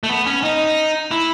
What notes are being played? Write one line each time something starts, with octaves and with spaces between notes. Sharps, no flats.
A3
B3
C#4
D#4
E4